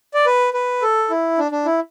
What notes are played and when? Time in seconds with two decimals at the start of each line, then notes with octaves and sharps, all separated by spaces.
0.14 D5
0.26 B4
0.54 B4
0.82 A4
1.10 E4
1.38 D4
1.52 D4
1.65 E4